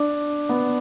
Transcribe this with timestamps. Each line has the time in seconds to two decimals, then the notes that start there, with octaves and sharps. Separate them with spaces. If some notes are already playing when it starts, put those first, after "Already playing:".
Already playing: D4
0.49 B3